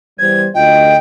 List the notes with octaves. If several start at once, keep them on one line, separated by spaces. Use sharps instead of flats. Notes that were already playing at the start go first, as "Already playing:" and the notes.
E2 G3 C5 G#6
D2 F4 D#5 G5